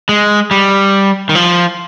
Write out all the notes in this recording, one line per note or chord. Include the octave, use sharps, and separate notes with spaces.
G#3
G3
D#3
F3